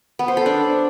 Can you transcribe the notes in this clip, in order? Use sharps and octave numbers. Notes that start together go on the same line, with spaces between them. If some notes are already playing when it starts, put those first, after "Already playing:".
B3
C5
A4
D4